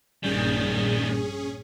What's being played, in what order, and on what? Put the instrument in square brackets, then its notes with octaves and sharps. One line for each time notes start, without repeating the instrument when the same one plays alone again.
[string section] A#1 G2 A#2 [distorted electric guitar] D#3 G3 [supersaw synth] C#4 G#4